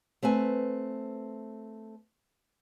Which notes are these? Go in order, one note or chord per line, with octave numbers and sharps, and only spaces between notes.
A3 C4 B4 G#5